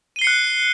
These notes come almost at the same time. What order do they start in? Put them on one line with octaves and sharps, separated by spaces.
D#7 G7 C7 C#7 F#6